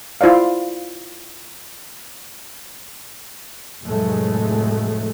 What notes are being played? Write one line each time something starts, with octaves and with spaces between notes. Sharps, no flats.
E4 F4 C5 D5 F5
F1 A2 F#3 G#3 A3